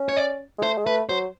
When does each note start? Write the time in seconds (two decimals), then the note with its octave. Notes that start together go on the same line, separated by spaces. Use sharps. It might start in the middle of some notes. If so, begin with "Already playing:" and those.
Already playing: C#4
0.09 C#5
0.17 D5
0.58 G#3
0.63 A3 C5
0.78 G#3
0.86 A3 B4
1.09 F#3 C5